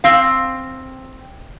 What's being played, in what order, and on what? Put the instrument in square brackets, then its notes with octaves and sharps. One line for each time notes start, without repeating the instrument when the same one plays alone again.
[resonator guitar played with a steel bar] C4 F5